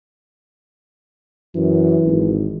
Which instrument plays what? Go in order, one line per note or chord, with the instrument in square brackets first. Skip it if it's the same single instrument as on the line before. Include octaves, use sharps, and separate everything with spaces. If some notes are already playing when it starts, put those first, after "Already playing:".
[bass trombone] F#2 [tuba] E3
[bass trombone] G#1